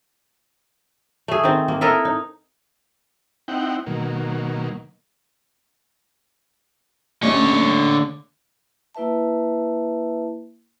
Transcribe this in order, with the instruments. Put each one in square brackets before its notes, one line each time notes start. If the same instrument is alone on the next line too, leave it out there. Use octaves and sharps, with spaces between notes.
[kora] A3 G#4
D#3 C4
A#3
E4 A4 A#4 D#5
D#4
[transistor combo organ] C4 D#4 E4 F#5 G5
B2 D#3 F#3 A#3
[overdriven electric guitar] D3 C#5 [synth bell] A3 A#3 C#4
[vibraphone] A#3 E4 B4 E5 A5